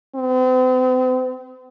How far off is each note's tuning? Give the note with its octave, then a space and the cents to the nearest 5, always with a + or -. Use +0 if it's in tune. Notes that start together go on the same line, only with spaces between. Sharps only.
C4 -40